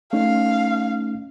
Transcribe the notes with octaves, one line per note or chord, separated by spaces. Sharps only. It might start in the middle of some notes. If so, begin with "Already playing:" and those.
A3 C#4 D#4 F5